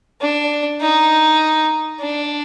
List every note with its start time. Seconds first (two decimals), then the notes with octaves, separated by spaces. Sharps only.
0.21 D4
0.81 D#4
2.01 D4